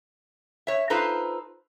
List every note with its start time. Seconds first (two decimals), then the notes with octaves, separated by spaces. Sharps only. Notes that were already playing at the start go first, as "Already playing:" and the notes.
0.67 C#5 E5
0.90 D#4 F4 A4 B4 C5